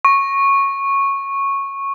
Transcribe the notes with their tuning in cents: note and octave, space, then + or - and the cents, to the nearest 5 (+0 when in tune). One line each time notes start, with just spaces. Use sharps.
C#6 -10